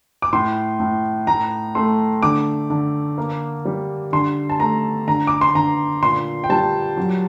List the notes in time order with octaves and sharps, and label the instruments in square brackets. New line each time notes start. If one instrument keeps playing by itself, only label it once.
[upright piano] D6
A2 C6
A2
A2 A#5
A3 C6
D3 D6
D3
A#3
G3
D3 C6
A5
A3 A#5
D3 A#5
D6
C6
D3 A#5
A#2 C6
G5
G3 A5
F#3